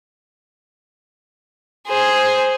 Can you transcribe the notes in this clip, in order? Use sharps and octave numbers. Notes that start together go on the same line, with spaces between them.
G#4 C5